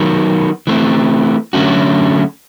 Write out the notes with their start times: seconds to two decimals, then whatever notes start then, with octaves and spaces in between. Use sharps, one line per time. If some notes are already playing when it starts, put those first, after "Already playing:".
Already playing: D#3 F#3 B3
0.67 E3 A3 C4
1.53 D3 F#3 A3 C#4 F#4